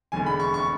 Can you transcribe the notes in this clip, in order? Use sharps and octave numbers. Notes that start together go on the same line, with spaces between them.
E1 E2 D3 G#5
B5
C#6
C#6